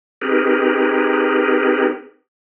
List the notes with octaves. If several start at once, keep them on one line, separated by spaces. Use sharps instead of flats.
C4 D#4 G4 G#4 A#4 B4